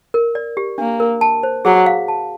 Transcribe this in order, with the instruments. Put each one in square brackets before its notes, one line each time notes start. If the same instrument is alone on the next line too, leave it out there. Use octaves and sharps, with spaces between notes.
[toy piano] A#4
D5
G4
[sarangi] A#3 [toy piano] D4
[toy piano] A#4
A5
C5
[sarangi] F#3 [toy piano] G#4
[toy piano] F5
A5